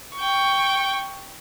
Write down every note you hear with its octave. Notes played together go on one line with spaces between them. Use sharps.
G5 C#6